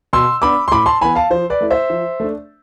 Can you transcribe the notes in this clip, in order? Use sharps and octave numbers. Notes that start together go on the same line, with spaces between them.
B2 C6 E6
B3 D4 B5 D6
C6
A2 B5 D6
A5 C6
E3 B3 G#5 B5
F5 A5
F3 C5
B4 D5
A3 E4
C5 E5
F3
A3 D4